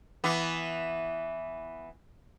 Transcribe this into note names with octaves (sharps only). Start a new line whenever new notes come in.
E3 B3